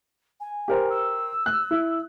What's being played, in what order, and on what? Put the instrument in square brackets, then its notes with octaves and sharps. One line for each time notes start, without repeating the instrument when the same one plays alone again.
[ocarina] G#5
[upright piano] G4 A#4 C5
[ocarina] E6
[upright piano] F#6
E4